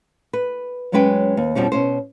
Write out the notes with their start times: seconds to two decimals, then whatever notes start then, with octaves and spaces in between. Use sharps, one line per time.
0.33 B4
0.92 F#2 F#3 G#3 C#4 B4 G5
1.37 D#2
1.55 F2 B2 F3 G3 C#4
1.72 B2 C#4 C5